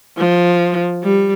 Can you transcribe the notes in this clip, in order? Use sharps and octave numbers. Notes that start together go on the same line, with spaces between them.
F3
G3